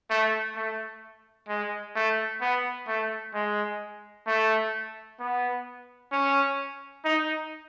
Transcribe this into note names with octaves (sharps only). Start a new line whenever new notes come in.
A3
A3
G#3
A3
B3
A3
G#3
A3
B3
C#4
D#4